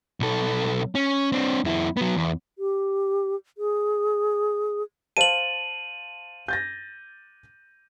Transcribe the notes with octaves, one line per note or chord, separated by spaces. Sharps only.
B1 A4
C#4
C4 D4
F2 E4
F#3 B3
E2
G4
G#4
C5 F5 A5 D#7 F#7
G6 A6 A#6